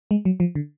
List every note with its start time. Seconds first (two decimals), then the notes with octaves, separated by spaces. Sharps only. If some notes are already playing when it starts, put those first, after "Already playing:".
0.11 G#3
0.25 F#3
0.40 F3
0.55 D3